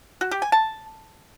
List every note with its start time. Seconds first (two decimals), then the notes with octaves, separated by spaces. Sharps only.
0.21 F#4
0.31 G4
0.42 G#5
0.52 A5